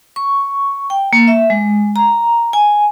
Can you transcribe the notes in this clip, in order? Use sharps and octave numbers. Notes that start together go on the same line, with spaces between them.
C#6
G5
A#3
E5
G#3
A#5
G#5